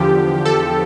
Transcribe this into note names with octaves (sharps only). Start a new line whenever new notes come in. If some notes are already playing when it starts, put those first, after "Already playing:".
Already playing: E2 D3 F3 G4
A4